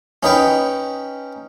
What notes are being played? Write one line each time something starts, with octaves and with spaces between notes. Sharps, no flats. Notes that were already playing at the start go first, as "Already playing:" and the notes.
C#4 D#4 B4 G5